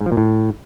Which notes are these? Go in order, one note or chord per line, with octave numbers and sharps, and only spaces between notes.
G#2
F3
A#2
A2